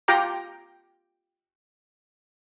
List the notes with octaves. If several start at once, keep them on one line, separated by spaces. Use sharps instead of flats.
F4 G4 G5 A#5 D6